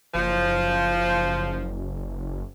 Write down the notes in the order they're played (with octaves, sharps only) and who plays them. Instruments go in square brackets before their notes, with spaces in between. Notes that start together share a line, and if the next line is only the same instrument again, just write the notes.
[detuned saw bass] F#1 [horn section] F3